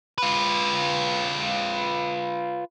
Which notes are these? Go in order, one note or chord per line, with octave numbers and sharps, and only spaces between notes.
F4 B4